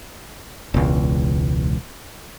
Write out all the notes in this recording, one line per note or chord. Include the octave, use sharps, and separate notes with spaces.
E1 C#2